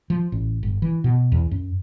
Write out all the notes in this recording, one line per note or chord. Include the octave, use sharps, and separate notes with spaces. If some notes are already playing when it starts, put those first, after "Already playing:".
F3
A1
G1
E3
B2
E2
F#2